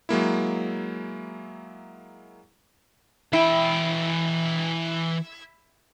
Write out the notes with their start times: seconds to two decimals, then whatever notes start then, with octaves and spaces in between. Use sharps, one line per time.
0.09 F#3 G#3 A#3 E4
3.33 E3 E4 G5